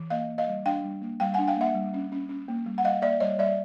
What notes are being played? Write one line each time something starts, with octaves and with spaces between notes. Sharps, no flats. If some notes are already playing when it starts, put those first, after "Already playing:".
Already playing: E3
A#3 D#5 F5
A#3
D#5 F5
G3
D4 F5 G5
G3
A#3
G3 F5 G5
F#5 G#5
D4
F5 G5
A#3 E5 F#5
G3
C#4
C#4
C#4
A#3
G3
F#5
G3 D#5 F5
A#3 D5 E5
G3 C#5 D#5
G3 D5 E5